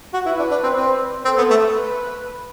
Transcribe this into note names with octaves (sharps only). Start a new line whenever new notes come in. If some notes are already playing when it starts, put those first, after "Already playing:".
F#4
E4 B4
D4
D4
C4
C4
C4 A4
B3
A3
B4